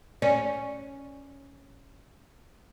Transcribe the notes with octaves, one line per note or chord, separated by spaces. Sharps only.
C#4 D5